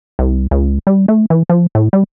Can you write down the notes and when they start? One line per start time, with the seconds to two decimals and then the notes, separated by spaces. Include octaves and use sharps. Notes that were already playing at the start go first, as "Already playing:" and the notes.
0.19 C2
0.51 C#2
0.87 G3
1.08 A3
1.30 E3
1.50 F3
1.75 A2
1.93 G3